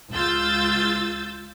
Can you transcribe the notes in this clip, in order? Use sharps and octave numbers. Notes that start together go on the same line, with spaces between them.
C#2 F4 E6 G6 A6